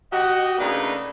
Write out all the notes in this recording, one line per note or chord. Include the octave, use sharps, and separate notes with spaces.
F#4 G4 D#5
C#3 A3 A#3 D4 D#4 B4